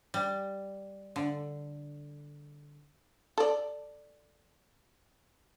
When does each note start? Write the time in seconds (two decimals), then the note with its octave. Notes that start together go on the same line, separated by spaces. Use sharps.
0.14 G3
1.16 D3
3.38 A4 D5